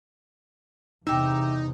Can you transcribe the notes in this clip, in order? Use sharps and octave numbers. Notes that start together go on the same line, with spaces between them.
E2 C3 D#4 G4 E5